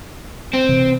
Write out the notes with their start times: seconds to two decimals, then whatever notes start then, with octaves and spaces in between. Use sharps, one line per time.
0.53 C4
0.69 C3 E3